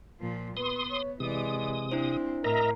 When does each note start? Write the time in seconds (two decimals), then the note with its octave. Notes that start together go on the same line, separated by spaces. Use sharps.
0.21 A#2 F3
0.57 B3 B4 C6 D#6
0.90 C#5
1.20 C3 E3 G#3 D5 D#6
1.92 C4 D4 E4 C5
2.44 A2 A#4 D#5 E5 A#5